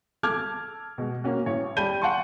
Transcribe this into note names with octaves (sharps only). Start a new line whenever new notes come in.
A4 A5 D6 F6 G#6
B2 G#3
A#3 C#4 F#4
A1 C#5
G3 A5 B5 G6 D#7 G7
F#5 G#5 A5 C6 C#6